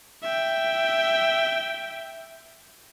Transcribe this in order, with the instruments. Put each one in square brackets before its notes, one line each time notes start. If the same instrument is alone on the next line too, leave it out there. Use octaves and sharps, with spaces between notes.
[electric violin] E5 G5